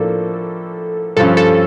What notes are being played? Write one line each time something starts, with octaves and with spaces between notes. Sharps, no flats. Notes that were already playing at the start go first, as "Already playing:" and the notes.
Already playing: A2 F3 A#3 D4 A4
G2 F3 C#4 A4
A4